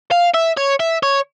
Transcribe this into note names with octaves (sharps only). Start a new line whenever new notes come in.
F5
E5
C#5
E5
C#5